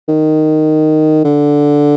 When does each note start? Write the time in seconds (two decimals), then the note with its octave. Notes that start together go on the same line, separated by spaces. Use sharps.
0.08 D#3
1.24 D3